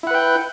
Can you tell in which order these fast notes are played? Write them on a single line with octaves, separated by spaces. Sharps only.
E4 F#5 B4 G5